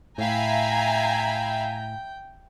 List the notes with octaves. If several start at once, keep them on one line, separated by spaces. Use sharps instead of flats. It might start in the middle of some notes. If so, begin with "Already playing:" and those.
A2 E5 F5 G5 G#5 A#5 B5